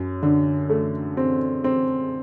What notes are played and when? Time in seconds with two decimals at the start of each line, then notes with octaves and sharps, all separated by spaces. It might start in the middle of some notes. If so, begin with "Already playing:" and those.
Already playing: F#2
0.23 D3
0.70 A3
1.17 C4
1.64 C4